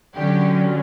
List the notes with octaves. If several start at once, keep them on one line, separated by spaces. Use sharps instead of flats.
D3 F#3 C#4 G4